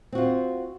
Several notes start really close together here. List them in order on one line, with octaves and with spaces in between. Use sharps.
C4 F#4 F4